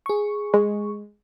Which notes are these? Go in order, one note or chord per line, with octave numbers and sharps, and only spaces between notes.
G#4 C#6
G#3